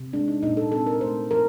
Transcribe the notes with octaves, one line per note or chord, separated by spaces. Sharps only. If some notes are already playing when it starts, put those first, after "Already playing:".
Already playing: C3
G#3 D4
D#4
A#2 D#4
A4
C4 A4
A#4
A3 C5
F3 A#4